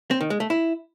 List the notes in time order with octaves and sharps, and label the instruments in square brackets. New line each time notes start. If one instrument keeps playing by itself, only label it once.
[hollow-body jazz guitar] C4
D#3
G#3
A3
E4